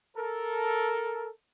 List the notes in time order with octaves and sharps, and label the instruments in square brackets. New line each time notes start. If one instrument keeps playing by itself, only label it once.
[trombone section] A4 A#4